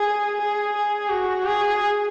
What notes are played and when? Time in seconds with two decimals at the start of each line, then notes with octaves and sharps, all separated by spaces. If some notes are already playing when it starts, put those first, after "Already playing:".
Already playing: G#4
0.37 G#4
0.74 G#4
1.10 F#4
1.46 G#4